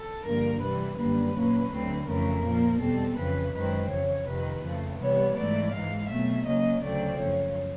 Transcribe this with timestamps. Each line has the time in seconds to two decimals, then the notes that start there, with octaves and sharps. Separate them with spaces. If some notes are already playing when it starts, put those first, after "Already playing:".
Already playing: A4
0.24 G2 D3 F3 A#3 A#4
0.61 C3 E3 G3 B4
0.97 F#2 D3 G3 A#3 B4
1.34 A#2 F#3 A#3 C#4
1.70 D2 D3 F#3 A3 C4
2.06 F2 C#3 E3 A3 C#4 A#4
2.43 A#2 F3 A#3
2.80 E2 B2 G3 C4 A4
3.16 F2 C#3 E3 B4
3.53 F#2 D#3 G#3 C4 B4
3.89 F2 C#3 E3 C#5
4.26 F2 C3 D#3 B4
4.62 F2 C#3 F3 A3
4.99 C3 E3 G3 B3 C#5
5.36 G#2 E3 A3 D5
5.72 G#2 E3 G#3 F5
6.09 B2 F#3 A3 C4 E5
6.45 C#3 F#3 A#3 C#4 D#5
6.82 D2 C#3 F#3 A3 C4 D5
7.18 F#2 C#3 F3 C#5